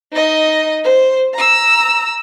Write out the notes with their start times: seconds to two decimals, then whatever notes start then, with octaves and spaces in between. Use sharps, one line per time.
0.12 D#4 D#5
0.84 C5
1.33 A#5 E6